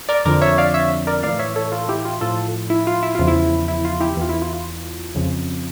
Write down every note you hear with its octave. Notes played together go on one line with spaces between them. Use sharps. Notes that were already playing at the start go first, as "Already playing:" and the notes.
A#4 D5
F2 D3 F3 A#4 D5
C#5 E5
D5 F5
C#5 E5
A#4 D5
A2 E3 D5 F5
C#5 E5
A4 C#5
F4 A4
E4 G4
F4
A2 F3 F4 A4
E4
F4
E4
E2 C#3 F3 F4
E4
E4
F4
E4 G4
E2 E3 F4
E4
F4
F4
F2 C#3 F3